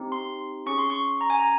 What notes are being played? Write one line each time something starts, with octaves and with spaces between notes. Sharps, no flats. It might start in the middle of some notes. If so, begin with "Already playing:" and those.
Already playing: C4 D#4 G4
C6
C#4 G#4 C#6
C6
C#6
A#5
G#5
A#5